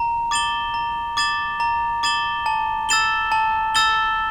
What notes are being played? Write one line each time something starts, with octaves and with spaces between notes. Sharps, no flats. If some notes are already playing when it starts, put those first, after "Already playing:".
Already playing: A#5
D6 A6 E7 G7
A#5
D6 A6 E7 G7
A#5
D6 A6 E7 G7
A5
E6 A6 E7 G7
A5
E6 A6 E7 G7